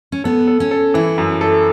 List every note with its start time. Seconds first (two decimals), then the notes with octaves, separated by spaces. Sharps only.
0.12 C#4
0.24 B3 A4
0.47 A4
0.60 C#4
0.71 A4
0.94 E3 E4
1.18 F#2
1.41 A4